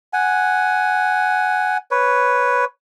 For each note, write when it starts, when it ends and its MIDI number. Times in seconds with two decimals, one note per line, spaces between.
0.13 1.77 78
0.13 1.77 80
1.91 2.65 71
1.91 2.65 73